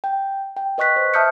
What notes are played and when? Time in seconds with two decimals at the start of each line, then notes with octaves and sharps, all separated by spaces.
0.04 G5
0.57 G5
0.78 B4 D#5 C#6 F#6 B6
0.96 C5
1.14 E5 A5 D#6 F6 G6 C#7